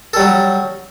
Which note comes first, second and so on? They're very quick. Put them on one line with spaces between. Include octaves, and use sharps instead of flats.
A4 G3 F#3